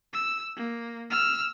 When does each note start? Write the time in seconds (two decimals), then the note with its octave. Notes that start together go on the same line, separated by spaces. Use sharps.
0.13 E6
0.56 A#3
1.10 E6 F6